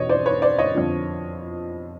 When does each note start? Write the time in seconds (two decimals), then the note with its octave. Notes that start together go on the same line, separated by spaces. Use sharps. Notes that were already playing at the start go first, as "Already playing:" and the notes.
Already playing: E2 B2 C#5 D#5
0.09 C5 D5
0.25 B4 C#5
0.42 C5 D5
0.58 C#5 D#5
0.75 F2 D3 F3